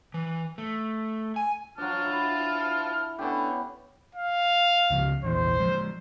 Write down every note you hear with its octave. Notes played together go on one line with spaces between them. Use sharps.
E3
A3
G#5
F#3 D4 F4 A5 F6
E4
D3 B3 C#4 G4
F5
C#2 C#3 F3
A#1 E2 E3 C5
F3 G#3